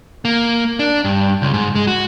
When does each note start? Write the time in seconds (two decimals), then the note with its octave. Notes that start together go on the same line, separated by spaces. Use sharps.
0.25 A#3
0.79 D4
1.05 G2
1.42 C#2
1.54 G#2
1.75 G#3
1.87 F#4